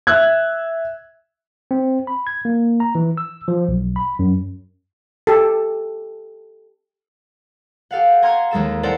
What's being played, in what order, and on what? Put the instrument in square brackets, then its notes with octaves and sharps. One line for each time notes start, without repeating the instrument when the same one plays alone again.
[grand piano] E5 E6 F#6 G#6
[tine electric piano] C4
B5
G#6
A#3
A#5
E3
E6
F3
B1
B5
F#2
[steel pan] G4 A4
[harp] G4 A4 F5 F#5
G#5 A#5 C6 C#6 F6 G#6
D#2 G#3 A4 E7
E4 A4 A#4 C5 D5 F#5